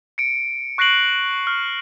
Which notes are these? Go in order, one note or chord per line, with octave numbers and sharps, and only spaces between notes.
C#7 D7
C#6 F#6 A#6 C7 D7 F#7
F6